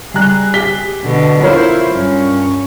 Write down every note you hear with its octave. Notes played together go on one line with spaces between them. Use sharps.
G3 G#4 A#5 F#6
G4 B6 G7
B2 D3
E4 F4 A#4 C5 C#5
G2 C#4